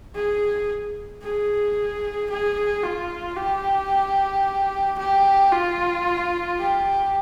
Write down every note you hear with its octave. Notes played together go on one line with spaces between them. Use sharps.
G#4
G#4
G#4
F4
G4
G4
F4
G4